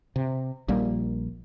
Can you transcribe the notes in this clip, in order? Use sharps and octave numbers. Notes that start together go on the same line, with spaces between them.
C3
A#1 G3 A#3